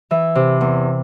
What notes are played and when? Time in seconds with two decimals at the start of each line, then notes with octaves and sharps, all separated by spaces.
0.11 E3 E5
0.35 C3
0.61 E2